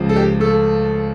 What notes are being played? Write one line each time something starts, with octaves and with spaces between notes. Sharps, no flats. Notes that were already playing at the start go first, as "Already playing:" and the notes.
Already playing: C#2 C#3 F3
A4
G4
A3 A4